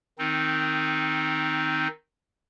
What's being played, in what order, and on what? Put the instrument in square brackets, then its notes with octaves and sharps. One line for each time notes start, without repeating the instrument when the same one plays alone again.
[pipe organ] D#3 C4 D#4